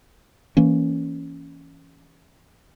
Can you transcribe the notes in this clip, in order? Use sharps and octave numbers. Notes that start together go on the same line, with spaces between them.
E3 A#3 C#4